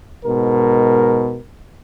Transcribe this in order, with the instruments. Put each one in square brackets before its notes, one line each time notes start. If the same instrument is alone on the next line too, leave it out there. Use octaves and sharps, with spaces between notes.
[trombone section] G#2 B2 A#4